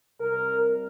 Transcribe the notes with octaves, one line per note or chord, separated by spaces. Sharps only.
C2 C3 A#4